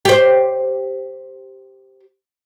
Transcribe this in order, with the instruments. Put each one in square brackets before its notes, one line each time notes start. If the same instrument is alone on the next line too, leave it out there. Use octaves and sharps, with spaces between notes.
[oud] G4 C5